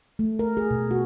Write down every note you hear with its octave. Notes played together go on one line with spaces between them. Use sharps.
A3
A#4
G#4
B2
F#4